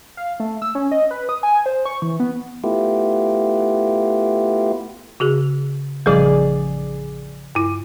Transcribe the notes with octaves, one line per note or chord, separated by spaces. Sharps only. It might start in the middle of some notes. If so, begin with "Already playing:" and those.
F5
A3
E6
C#4
D#5
B4
D#6
G#5
C5
C#6
E3
B3
A3 B3 E4 F4 G4
C#3 F#4 G#4
A1 C#3 F3 G3 G#4 D5
G2 E4